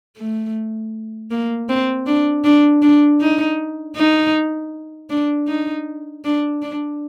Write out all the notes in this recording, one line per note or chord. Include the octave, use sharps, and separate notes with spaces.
A3
A#3
C4
D4
D4
D4
D#4
D#4
D4
D#4
D4
D4